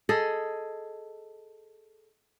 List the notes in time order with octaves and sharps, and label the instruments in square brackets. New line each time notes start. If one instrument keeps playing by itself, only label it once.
[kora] G#4 A4 D#5